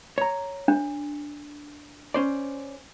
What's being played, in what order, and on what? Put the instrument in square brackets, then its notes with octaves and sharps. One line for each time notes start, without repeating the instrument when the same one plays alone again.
[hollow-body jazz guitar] C#5 A#5
[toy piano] D4
[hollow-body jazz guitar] C#4 C5 D5